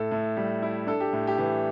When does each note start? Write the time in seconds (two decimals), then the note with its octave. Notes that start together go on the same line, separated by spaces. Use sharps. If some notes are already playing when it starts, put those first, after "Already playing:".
Already playing: A2 A4
0.11 A2
0.37 G3
0.62 E4
0.87 D4 A4
1.00 G4
1.13 A2
1.27 G4
1.38 E3